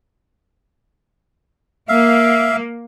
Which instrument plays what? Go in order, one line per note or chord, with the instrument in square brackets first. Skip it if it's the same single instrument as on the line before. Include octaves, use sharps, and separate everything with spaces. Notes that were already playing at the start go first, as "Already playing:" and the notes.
[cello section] A#3 [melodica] E5 F5